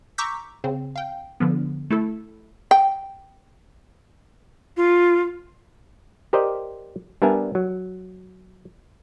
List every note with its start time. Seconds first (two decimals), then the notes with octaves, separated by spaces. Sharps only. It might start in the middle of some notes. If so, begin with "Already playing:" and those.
0.18 A#5 C#6 D6 E6 G6 B6
0.64 C#3 C4
0.96 F5 G5
1.40 D3 F3 B3
1.90 A3 E4 A4
2.71 G5
4.77 F4
6.33 G4 A#4 C5 D5 D#5 G5
7.22 G3 B3 D4 A#4 E5 G#5
7.55 F#3